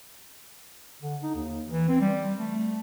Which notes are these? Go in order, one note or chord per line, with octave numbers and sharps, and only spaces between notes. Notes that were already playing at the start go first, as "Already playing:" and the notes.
D3
D#4
D#2
E3
C4
G3
A3